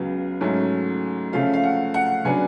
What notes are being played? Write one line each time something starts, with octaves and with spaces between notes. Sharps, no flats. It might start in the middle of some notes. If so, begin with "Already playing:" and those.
Already playing: C#2 C#3 F#3 B3
G#2 F#3 A3 C#4
C#3 F3 A3 C#4 F5
F5
F#5
F#5
C#3 F#3 B3 D4 G#5